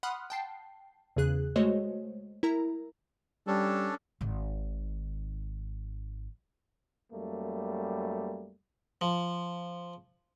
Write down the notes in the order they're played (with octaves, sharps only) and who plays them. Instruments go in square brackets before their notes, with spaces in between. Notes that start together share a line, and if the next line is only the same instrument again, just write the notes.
[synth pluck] F#5 B5 C6 D#6 F6 F#6
G5 A5 C7
E2 C#3 G#4 F#6
G#3 A3 F#4 C5 C#5 D#5
E4 A#4 A#5
[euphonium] G3 [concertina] C#4 D4 A4
[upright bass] G#1 D#3
[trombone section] F#2 G3 A3 A#3
[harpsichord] F3